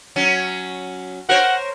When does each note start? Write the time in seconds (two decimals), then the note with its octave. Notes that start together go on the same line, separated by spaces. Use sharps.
0.16 F#3 C#4
1.29 A#4 C5 C#5 F#5